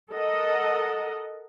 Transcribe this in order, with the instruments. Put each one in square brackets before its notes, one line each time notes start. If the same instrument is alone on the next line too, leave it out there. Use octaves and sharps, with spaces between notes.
[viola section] A4 A#4 D#5 F#5